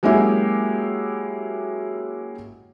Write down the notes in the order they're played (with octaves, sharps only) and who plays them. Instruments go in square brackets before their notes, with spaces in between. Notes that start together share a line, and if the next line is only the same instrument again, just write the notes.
[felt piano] F#3 G#3 A#3 C#4 E4 G4